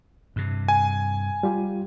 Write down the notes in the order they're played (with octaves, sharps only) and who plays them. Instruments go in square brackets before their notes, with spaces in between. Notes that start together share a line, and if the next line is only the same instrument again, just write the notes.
[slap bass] G2 C3
[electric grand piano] G#5
[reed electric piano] G3 F4 G4